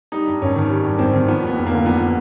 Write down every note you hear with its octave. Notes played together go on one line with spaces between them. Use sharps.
G3 D#4
G2
G#1 C#4
D#3
G3
G2
G#1 C4
D#3
F3 B3
D#2 B3
F1
D3 A#3
F3 B3